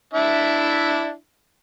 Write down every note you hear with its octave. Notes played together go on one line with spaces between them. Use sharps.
D4 E4 E5